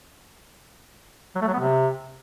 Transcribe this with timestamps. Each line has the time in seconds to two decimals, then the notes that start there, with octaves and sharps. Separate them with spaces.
1.35 F#3
1.41 A3
1.47 F#3
1.53 B3
1.59 C3